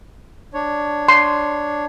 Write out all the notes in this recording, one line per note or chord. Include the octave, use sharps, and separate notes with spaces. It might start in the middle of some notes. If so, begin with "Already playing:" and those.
D4 C#5
C6